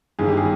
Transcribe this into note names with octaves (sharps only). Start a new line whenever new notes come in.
G1 G2 D#3 G#4
G4
G#4